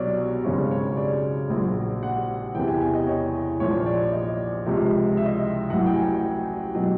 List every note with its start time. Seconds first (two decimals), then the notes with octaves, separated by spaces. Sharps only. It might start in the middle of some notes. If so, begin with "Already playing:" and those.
Already playing: C2 B2 F#3 C#5 D5
0.44 G#1 F#2 C#3 C#5
0.71 C#5
0.97 D5
1.50 A#1 A#2 F#3
2.03 F#5
2.54 E2 C3 E3 G5
2.68 G#5
2.81 G#5
2.94 D#5
3.07 C#5
3.60 A#1 A#2 F3 C#5
3.86 D5
4.13 D#5
4.66 C#2 C3 F3
5.17 E5
5.25 D#5
5.34 E5
5.70 A1 A2 F#3 F#5
5.86 G5
5.96 G#5
6.75 B2 F#3